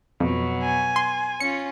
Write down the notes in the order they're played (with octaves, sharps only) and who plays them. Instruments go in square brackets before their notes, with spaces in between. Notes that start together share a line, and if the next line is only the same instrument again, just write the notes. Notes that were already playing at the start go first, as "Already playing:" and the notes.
[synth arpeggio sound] F2 [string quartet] B2 F#3
[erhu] G#5
[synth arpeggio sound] C6
[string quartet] C#4 F4 [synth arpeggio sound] C#7